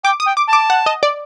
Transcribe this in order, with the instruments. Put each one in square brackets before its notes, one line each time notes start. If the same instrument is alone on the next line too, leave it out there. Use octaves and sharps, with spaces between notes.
[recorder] G5 [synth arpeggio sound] D6
[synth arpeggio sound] D#6
[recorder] G5
[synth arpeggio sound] D6
[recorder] A5
[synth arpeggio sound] D6
F#5
D#5
D5